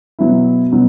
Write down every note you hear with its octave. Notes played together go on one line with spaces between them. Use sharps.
B2 F#3 B3 E4
B2 F#3 B3